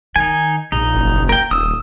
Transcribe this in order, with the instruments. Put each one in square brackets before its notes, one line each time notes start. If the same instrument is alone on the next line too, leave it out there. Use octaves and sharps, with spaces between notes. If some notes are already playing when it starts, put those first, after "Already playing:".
[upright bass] D#3 [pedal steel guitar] D#4 G#5
[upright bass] A#1 [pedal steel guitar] D#4
[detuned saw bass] F#1
[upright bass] A#3 [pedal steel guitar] A#4 G5
[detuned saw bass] D#1 [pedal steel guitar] D#6 E6